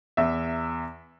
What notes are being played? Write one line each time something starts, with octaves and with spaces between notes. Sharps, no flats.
E2 E5